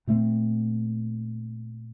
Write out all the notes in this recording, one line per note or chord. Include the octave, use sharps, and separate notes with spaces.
A#2 A3 C4